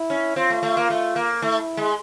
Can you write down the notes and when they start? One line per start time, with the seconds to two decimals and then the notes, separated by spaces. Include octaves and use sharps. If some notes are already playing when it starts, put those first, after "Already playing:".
Already playing: E4
0.10 C#4
0.36 C4 F4
0.50 A3
0.63 A3
0.77 A#3
0.90 A3
1.16 A#3
1.42 A3 E4
1.77 G#3